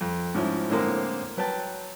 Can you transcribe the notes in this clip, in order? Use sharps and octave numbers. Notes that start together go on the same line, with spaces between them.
F2
G#2 F3 C#4 E4
A2 D3 G#3 A#3 C4
F#3 B4 G5 A5